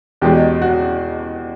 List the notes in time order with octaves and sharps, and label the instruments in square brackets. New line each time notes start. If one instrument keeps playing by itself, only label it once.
[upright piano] E2 B2 G#3 G4
F#4